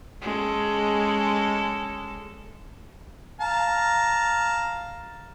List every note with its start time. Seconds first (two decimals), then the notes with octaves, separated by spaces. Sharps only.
0.22 G#3 C#4 A4
3.41 F5 A5 A#5